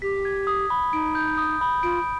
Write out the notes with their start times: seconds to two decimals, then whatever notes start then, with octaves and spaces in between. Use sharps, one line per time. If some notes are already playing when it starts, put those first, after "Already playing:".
0.02 G4 B6
0.25 G#6
0.47 D#6
0.70 B5
0.93 D#4 D7
1.15 G6
1.38 D#6
1.61 B5
1.83 F4 D7